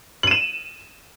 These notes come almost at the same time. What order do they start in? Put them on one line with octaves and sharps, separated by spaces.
F#7 D#7 E7